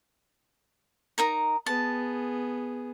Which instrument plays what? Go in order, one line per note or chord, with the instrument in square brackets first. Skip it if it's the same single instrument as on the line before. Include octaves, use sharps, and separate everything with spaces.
[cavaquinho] D#4 A#4 A#5
[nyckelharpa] B3 G#4 [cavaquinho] A5